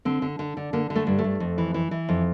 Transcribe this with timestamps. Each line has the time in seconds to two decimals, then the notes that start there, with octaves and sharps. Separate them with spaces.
0.05 D3 C4
0.22 D3
0.39 D3
0.57 D3
0.73 D3 A#3
0.90 D3
0.95 A3
1.07 G2
1.18 A3
1.24 G2
1.40 F2
1.58 E3
1.74 E3
1.91 E3
2.09 F2